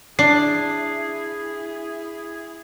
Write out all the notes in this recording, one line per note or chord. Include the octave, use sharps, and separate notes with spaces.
D4 E4 G#4 C7